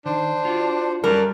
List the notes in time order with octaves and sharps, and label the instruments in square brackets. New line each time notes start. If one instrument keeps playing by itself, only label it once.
[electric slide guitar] D#3 [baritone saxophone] D4 [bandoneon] C5
[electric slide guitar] F4 F#4
[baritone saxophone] F#2 [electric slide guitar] G3 A4 [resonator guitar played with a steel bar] A#4 [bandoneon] D5 A5